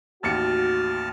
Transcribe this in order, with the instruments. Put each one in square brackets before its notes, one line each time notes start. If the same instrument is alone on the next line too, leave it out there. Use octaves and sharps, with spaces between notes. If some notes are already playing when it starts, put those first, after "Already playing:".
[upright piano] A1 D#2 C#7 [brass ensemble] F#4 [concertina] A5 F6